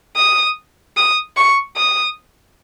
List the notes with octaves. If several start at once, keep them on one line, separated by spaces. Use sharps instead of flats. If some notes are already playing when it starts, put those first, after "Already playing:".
D#6
D#6
C#6
D#6